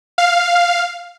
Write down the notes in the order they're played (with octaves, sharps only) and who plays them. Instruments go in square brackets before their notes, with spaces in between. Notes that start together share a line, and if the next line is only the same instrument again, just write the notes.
[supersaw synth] F5